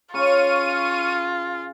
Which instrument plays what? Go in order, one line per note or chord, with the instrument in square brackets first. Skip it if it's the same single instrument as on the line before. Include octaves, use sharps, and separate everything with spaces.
[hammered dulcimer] C#3 [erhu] F4 [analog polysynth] C#6 F6 D#7